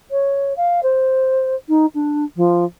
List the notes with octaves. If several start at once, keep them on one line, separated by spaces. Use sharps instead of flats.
C#5
F5
C5
D#4
D4
F3